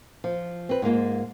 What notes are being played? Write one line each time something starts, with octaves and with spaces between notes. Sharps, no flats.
F3
C4 B4
G#2 G#3 A#3 F4